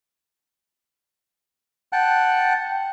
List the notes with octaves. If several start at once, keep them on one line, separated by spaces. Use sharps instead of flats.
F#5 G5 A5 F#6